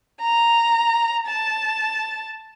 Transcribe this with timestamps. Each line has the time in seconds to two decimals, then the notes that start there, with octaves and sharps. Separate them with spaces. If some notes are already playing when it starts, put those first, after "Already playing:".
0.21 A#5
1.27 A5